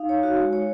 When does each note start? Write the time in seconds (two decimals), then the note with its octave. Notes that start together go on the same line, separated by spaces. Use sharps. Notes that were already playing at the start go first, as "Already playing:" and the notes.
Already playing: D#4 F5
0.09 C#5
0.23 F#4
0.38 G#3
0.53 C#5